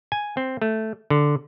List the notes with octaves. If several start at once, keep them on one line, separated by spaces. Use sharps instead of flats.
G#5
C4
A3
D3